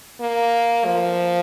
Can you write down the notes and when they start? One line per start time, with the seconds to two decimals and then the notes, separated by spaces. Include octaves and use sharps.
0.20 A#3
0.86 F3